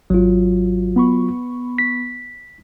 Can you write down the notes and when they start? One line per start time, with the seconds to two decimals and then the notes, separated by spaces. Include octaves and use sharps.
0.10 G#1 F#3 F4
0.96 B3 B5 C#6
1.78 B6